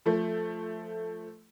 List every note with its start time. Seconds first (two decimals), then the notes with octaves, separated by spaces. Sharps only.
0.06 F3 A3